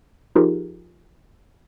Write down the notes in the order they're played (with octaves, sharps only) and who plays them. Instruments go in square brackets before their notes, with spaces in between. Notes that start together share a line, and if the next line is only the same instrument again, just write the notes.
[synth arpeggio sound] F3 D#4 F4 G4 G#4 A#4